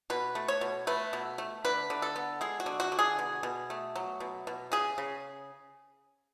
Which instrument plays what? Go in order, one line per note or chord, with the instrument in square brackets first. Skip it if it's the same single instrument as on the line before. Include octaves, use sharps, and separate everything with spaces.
[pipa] B2 B4
A3
C#5
B2
A3 B4
B2
A3
D3 B4
D3
A4
B3
G#3 G#4
F#4
D3
F#4
D3
G#4
B2
B2
A3
F#3
B2
B2
C#3 G#4
C#3